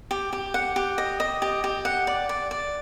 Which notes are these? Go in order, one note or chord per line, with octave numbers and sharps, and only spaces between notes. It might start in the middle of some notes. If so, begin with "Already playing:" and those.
G4
G4
F#5
G4
D#5
D#5
G4
G4
F#5
D5
D5
D5